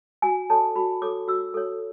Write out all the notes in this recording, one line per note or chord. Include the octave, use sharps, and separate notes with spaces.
F#4 G#5
A4 C#5 A5
F#4 B5
A4 C#5 D6
F#4 E6
A4 C#5